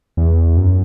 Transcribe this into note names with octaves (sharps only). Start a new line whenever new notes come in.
E2
F#2